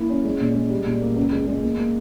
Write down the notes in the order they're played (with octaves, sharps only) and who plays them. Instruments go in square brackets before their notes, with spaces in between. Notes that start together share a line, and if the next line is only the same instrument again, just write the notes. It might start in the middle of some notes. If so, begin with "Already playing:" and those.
Already playing: [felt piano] A#3 E4
C#4
G#3
A#2
G#3
G3
A#2
A#3
C#2
G#3
G#3
A#3
A#3